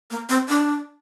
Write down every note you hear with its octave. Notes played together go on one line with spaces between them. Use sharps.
A#3
C4
D4